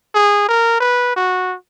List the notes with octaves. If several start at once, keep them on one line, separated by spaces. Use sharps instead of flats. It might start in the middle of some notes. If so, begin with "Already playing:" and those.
G#4
A#4
B4
F#4